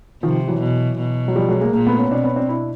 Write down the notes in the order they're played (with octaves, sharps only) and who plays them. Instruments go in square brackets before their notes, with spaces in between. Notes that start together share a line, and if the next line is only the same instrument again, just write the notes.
[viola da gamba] C3 [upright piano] D#3 F3
[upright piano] E3 F#3
[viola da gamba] B2
B2
[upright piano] F#3
F3 G3
F#3 G#3
G#3 A#3
[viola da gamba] A#2 [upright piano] G#3 A#3
[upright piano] A3 B3
B3 C#4
[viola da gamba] B2 [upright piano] C4 D4
[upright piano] B3 C#4
C4 D4
D4 E4